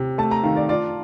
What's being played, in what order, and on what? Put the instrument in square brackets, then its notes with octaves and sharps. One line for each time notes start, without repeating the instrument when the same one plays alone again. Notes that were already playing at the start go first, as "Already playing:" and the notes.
Already playing: [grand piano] C3
[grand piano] A3 [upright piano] A5
[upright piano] A#5
[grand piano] D#3 [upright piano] F5
[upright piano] D5
[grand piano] F4 [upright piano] D5